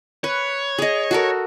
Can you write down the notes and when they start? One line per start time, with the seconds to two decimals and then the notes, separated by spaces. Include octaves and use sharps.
0.24 B4 C#5
0.78 G#4 D#5
1.11 F#4 A4 A#4